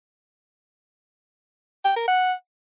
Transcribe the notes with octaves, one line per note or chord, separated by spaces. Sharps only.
G5
A#4
F#5